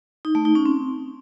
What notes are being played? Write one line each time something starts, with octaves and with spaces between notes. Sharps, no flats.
D#4
A3
D#4
C#4
C4